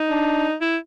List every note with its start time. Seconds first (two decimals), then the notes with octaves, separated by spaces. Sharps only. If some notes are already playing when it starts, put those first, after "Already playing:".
Already playing: D#4
0.10 D4
0.61 E4